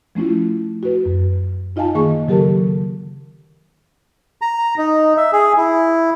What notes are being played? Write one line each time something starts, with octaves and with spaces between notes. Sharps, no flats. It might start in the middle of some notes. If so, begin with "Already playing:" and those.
F3 A3 C#4 E4 F4
F#4 B4
F#2
D#4 F4 D#5 F5 G#5 A5
D#3 A#3 G#4 D#5 A5 C#6
C#3 F#3 G4 A4 A#4 A5
A#5
D#4
E5
G#4
E4